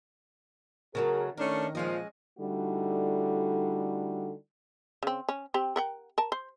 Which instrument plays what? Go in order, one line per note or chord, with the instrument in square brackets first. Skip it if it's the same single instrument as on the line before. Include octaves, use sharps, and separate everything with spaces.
[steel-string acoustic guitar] C#3 F#3 A3 [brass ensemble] G#4 A#4
[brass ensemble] D#3 [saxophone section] A3 C#4 D4 [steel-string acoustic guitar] A#4
[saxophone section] A#2 F3 [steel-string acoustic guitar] G#3 C#4 D#5
[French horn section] D3 G3 A3 D#4 E4 F#4
[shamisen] C#3 C4
C#4
C4 G4
A#4 F#5 G5
A#4 A5
C5